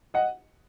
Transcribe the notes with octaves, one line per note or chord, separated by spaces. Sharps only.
D#5 F#5